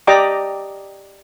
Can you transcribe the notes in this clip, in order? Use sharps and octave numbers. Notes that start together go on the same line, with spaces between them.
G4 D5 D#5 G5 A#5 D6